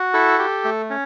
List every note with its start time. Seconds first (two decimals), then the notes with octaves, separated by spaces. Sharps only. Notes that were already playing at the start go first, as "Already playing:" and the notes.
Already playing: F#4
0.14 E4 A4
0.39 G4
0.64 A3
0.90 C#4